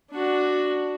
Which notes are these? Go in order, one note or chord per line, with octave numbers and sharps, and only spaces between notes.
D4 F#4